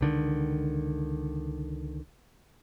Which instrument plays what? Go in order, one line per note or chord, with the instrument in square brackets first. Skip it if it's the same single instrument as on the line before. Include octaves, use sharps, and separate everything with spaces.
[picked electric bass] C#2 D3 D#3